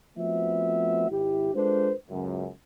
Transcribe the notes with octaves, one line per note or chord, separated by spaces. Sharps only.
F3 A3 B3 C4 F#4 E5
G#1 E4 G4
G#3 D4 F4 A4 B4 C5
C#2 F#2